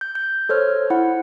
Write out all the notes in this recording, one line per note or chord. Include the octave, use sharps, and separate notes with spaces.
G6
G6
A4 C5 C#5 F6
E4 F#5